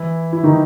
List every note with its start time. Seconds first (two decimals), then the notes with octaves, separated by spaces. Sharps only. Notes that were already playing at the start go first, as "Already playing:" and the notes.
Already playing: E3 E4
0.33 E4
0.44 D#3 D#4